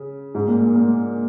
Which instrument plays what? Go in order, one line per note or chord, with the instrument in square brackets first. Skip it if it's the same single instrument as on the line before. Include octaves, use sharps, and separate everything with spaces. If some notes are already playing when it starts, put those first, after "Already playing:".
Already playing: [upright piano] C#3
G#2
A#2
A#2
A#2